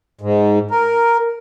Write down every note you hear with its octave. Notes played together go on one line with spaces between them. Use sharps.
G#2
A#4